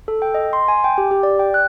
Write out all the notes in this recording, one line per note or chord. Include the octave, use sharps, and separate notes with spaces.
A4
G5
D#5
C6
G#5
G5
G4
G4
D5
G5
F#6